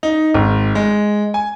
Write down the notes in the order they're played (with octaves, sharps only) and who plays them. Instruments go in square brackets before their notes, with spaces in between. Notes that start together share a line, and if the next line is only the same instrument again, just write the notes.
[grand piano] D#4
G#1
G#3
G#5